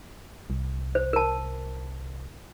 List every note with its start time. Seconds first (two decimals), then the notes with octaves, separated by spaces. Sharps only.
0.50 C2
0.95 C5
1.13 A#4 A5